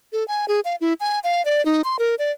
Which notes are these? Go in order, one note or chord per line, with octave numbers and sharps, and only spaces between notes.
A4
G#5
G#4
F5
E4
G#5
F5
D5
D#4
C6
A#4
D5